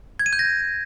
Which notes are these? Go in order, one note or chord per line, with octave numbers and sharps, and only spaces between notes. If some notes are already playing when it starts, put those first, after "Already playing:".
G#6
D#7
G6
A#6